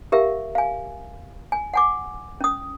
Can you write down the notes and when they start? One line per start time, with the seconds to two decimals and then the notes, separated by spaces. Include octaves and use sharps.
0.12 G4 A#4 E5 F5
0.55 F5 G#5
1.52 G#5
1.74 F#5 G#5 D6
2.41 C#4 D#6